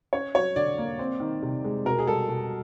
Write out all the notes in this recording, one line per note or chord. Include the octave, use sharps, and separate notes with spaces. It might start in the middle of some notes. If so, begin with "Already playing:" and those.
C#4 C#5
F#3 C#5
D3 D5
A#3
C4
D#3
C3
G#3
B2 A#4
G#4
G3 A4
B2